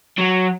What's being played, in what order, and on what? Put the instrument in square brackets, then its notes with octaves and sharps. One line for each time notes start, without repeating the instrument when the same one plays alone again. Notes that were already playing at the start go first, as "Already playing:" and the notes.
[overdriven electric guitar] F#3